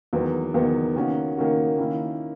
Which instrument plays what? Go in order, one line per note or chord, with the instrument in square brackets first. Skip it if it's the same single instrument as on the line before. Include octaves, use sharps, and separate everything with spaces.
[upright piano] E2 D#3 F#3 B3
E2 D#3 F#3 B3
D#3 A#3 C#4 F#4
D#3 A#3 C#4 F#4
D#3 A#3 C#4 E4